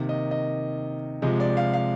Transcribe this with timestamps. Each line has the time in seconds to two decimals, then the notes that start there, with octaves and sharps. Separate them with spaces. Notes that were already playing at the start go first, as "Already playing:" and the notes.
Already playing: C3 D#3 A#3
0.09 D#5
0.31 D#5
1.22 C3 F3 G#3 D#5
1.40 D5
1.57 F5
1.73 F5